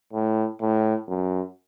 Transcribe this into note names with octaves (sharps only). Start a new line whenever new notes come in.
A2
A2
F#2